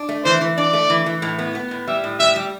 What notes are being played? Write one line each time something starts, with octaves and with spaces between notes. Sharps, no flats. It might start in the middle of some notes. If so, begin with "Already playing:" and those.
Already playing: D4
A3
E3 C5
E3
D4 D5
A3
E3
E3
A2
B3
B3
A2
G3 E5
A2
G3 E5
G3